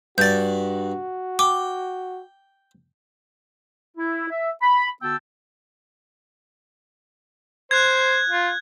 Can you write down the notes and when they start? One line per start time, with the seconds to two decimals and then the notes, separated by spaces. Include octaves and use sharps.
0.18 G2 F#4 D5 G6 A6
1.39 G5 D6
3.97 E4
4.30 E5
4.62 B5
5.02 D3 B3 F#4 G5 A5 E6
7.71 C5 F#6 G#6
8.28 F4